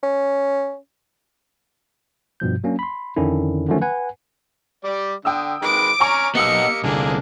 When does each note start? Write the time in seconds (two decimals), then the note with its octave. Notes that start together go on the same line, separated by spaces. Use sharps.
0.03 C#4
2.40 G2 B2 F3 G6
2.64 F#3 A#3 C#4 D4
2.79 B5 C6
3.16 F2 D3 D#3 C#4 D4 E4
3.68 D3 D#3 F3 F#3 A3 C#4
3.81 B4 F#5 G#5
4.84 G3 D5
5.25 D3 G5 D#6 E6
5.63 D#3 G#3 B4 D6 D7
6.00 C#5 G#5 A#5 C#6 F6
6.35 A#3 B3 D#4 G4 D#5 D#6 E6 C#7
6.84 C2 D3 A#3 D4 G#4